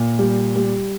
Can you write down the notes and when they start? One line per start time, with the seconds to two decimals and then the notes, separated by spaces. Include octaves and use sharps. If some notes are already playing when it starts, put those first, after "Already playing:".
Already playing: A#2
0.19 G3
0.56 G3